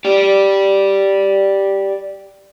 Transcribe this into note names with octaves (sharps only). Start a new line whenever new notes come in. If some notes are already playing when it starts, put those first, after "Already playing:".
G4 D5